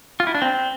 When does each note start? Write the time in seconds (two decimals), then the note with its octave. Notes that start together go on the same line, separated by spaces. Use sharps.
0.20 F4
0.27 E4
0.35 D4
0.42 C4